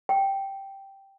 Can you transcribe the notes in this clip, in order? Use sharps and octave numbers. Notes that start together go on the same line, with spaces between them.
G5